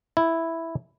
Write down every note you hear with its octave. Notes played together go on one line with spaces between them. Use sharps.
E4